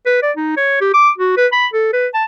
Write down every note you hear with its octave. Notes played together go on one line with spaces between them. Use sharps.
B4
D5
D#4
C#5
G4
D6
F#4
B4
B5
A4
B4
A5